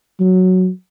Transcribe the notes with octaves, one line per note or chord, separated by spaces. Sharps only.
F#3